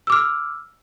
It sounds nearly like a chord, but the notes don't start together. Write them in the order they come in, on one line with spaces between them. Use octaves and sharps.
E6 D6 F6